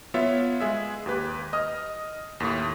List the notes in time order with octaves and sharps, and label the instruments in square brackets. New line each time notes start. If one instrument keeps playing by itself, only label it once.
[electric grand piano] B3 F4 C#5 E5
G#3 G#4 E5
D#2 G4 B4
D#5 D#6 F6
D#2 A2